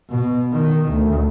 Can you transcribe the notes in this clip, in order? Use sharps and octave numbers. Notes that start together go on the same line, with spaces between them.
B2
D#3
D2